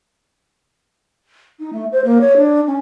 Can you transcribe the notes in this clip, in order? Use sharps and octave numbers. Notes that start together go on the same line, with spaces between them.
D#4
A3
C5
A#3
C#5
D4
C#4